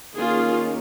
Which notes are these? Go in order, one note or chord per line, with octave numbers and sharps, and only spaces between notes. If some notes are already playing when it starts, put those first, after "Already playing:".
D#3 A#3 C#4 F4 G#4